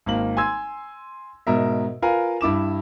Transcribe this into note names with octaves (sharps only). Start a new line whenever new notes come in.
G#1 A#3 F#7
G#5 C6 E6 G#6
G#2 B2 A#4 E5
F4 A#4 B4 F5 G#5
G2 E4 D6 E7